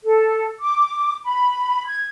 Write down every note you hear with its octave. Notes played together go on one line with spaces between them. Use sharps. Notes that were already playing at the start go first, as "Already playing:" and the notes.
A4
D6
B5
G#6